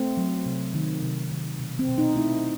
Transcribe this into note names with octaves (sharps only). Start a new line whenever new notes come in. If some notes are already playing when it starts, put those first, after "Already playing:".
Already playing: A3 C4
F#3
C3
D#3
C3
D#3
B2
C4
B2
D#4
A3 E4